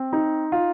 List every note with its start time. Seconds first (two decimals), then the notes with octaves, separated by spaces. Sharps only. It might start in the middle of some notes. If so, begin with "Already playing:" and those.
Already playing: C4
0.13 D#4
0.52 F4